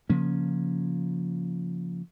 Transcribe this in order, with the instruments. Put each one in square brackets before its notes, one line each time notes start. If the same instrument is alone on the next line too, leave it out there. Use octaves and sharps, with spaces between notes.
[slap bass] C#3 F3 A#3 C#4